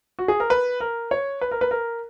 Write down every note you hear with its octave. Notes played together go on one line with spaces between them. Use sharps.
F#4
G#4
A#4
B4
A#4
C#5
B4
A#4
B4
A#4